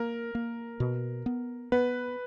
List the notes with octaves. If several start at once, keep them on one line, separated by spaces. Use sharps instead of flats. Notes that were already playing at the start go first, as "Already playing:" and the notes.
Already playing: A#3 A#4
A#3
B2
B3
B3 B4